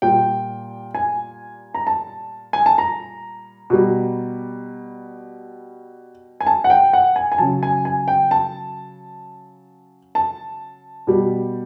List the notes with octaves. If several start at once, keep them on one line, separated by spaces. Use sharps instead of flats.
A#2 G3 G5
G#5
A#5
A5
G#5
A5
A#5
B2 G3
G#5
A5
F#5
G5
F#5
G#5
G#5
C#3 F#3 A5
G#5
G#5
G5
A5
A5
B2 G3